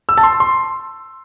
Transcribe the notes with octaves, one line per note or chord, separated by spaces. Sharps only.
E6
A5
C6
C6